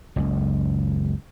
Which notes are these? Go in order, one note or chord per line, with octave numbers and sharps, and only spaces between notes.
F#1 C#2